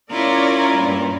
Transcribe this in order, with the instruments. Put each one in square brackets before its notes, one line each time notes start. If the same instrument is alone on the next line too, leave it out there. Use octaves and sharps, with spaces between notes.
[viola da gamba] C#4 E4 F4 [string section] A#4 C#5 D5 [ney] A#5
[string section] G2 A#2